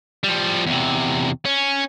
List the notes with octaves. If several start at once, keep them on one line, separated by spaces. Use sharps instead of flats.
F3 G3
E2 C3
C#4